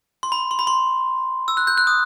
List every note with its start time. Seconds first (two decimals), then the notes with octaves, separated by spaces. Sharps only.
0.23 C6
0.32 B5
0.51 C6
0.59 B5
0.67 C6
1.48 E6
1.57 F#6
1.67 G6
1.77 F#6
1.87 D#6